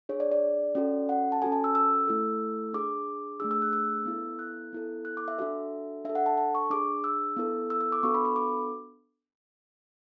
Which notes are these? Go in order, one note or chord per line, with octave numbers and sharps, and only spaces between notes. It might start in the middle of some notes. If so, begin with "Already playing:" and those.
D4 G#4 C#5
D5
D5
C#4 F#4 A4
F#5
A5
C#4 F#4 A4 G#5
A5
E6
E6
A3 E4 A4
D4 G#4 D6
A3 D4 G#4 E6
E6
F#6
E6
B3 E4 A4
F#6
B3 E4 A4
F#6
D6
E5
D4 F#4 A4 E5
D4 A4 E5
F#5
A5
A5
C#6
D4 G#4 D6
E6
B3 E4 A4
E6
E6
D6
B3 D4 F#4 A4 C#6
B5
B5
D6